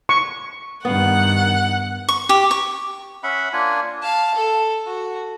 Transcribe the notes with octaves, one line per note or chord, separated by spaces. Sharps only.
C#6
G2 D#3 B3 F5 F#5
C#6
G4
C#6
C#4 E5 F#5 B5
A#3 D4 F4 G#5
F5 A5
A4
F#4